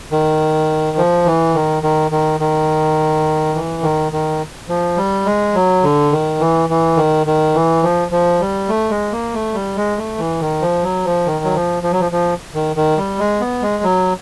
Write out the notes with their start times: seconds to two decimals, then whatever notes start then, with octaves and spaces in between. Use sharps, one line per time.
0.12 D#3
0.97 F3
1.26 E3
1.55 D#3
1.83 D#3
2.11 D#3
2.40 D#3
3.55 E3
3.83 D#3
4.12 D#3
4.69 F3
4.97 G3
5.26 G#3
5.55 F#3
5.84 D3
6.12 D#3
6.40 E3
6.69 E3
6.97 D#3
7.27 D#3
7.55 E3
7.83 F3
8.11 F3
8.41 G3
8.68 A3
8.90 G#3
9.12 A#3
9.34 A3
9.54 G3
9.77 G#3
9.98 A3
10.18 E3
10.41 D#3
10.62 F3
10.83 F#3
11.05 F3
11.26 D#3
11.45 F#3
11.55 F3
11.83 F3
11.92 F#3
12.00 F3
12.12 F3
12.54 D#3
12.76 D#3
12.98 G3
13.19 G#3
13.41 B3
13.62 G#3
13.83 F#3